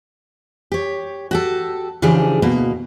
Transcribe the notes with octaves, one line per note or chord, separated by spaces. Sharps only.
G4 C#5
F#4 G4 A4
C#3 E3 F3 D4 G4 G#4
D2 B2 A#3